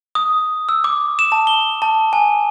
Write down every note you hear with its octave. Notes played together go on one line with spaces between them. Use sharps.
D#6
E6
D6
E7
A5
G7
A5
G#5